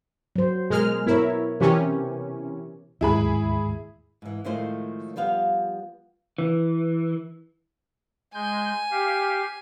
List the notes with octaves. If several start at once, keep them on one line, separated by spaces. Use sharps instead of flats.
F#3 C5
B2 G#3 A#4 F6
B3 E4 A#4 C#5
C3 E3 C#4 G4 A#4
D1 D#2 G#2 E4 G#4 B5
G#2 E3
A2 D#3 F3 G#3 A3 C5
F3 G3 B3 F5
E3
G#3 G#5 G6
G4 F5